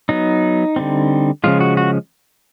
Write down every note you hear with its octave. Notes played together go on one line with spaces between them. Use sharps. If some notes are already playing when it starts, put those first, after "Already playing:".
F#3 B3 D#4
D3 G3 C4
C#3 F3 G#3 F4
F#4
F#4